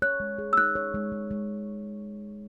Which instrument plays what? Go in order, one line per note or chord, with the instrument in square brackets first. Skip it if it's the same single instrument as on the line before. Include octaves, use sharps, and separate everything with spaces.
[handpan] C#5 [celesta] F#6
[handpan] G#3
G#4
[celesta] E6
[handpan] D#4 [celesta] F#6
[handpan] C#5
G#3
G#3
G#3